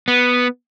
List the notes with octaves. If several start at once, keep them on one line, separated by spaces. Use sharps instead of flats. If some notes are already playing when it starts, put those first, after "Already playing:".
B3